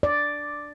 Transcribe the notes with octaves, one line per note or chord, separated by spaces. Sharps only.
D5